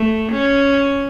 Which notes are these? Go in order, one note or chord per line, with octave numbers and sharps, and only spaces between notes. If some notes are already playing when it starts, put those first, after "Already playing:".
Already playing: A3
C#4